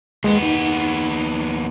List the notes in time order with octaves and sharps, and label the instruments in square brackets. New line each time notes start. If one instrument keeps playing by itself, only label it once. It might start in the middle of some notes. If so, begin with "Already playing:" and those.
[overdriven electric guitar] D#2 B3 [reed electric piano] G#3 D#5
[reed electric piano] D#4